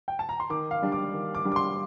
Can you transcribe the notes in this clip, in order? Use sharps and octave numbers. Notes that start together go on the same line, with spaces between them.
G5
A5
A#5
C6
D#3 D6
F5
G3 D4
D6
D#3
D6
G3 D4
D6
C6